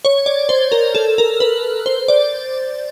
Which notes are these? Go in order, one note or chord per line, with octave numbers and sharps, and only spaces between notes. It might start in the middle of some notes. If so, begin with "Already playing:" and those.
C#5
D5
C5
A#4
A4
A#4
B4
C5
D5